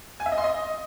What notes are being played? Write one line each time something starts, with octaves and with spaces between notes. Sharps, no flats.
G#5
E5
D#5
C6
D#5